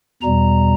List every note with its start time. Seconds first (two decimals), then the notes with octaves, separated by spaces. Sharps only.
0.22 E2 B2 G3 A#5